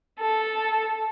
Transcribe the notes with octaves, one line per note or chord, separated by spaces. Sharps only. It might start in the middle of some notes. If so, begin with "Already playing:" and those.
A4